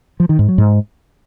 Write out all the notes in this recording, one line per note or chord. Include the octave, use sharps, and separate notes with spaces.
F3
D#3
G#2
F#3
G#2